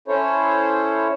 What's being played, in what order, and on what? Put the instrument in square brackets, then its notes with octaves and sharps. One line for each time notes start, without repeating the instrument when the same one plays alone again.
[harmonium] C#4 E4 A4 C5 C#5